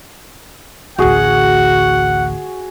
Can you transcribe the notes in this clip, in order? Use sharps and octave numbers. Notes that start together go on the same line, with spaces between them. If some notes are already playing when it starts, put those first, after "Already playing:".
A1 D2 F#4 G#4 F#5